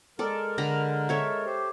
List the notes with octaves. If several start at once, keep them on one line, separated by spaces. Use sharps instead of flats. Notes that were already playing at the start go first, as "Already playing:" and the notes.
G#3 A4 A#4 D5
D3 A#5 B5
A4 C#5 E5
G4 C5